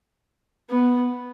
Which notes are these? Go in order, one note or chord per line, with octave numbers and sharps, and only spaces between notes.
B3